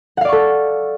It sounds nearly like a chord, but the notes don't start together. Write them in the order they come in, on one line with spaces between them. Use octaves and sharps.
F#5 F5 D5 C#6 A4